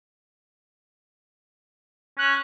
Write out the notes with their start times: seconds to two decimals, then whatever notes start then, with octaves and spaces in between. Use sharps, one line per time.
2.18 C#4 F#6